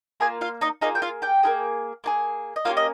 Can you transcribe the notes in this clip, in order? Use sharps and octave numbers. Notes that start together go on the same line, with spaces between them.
A#3 F4 G#4 G#5
F4 F5
D#4 D#5
A#3 D#4 F4 G#4 D#5
G5
F4 F5
G4 G5
A#3 F4 G#4
A#3 F4 G#4
D#5
A#3 C#4 F4 G4 F5
D#5